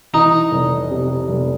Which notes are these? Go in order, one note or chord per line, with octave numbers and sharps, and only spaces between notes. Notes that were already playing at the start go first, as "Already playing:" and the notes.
E3 D#4
F1
C3
F1